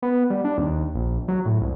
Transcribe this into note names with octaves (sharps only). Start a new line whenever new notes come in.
B3
G3
D4
D#2
A#1
F#3
A2
C2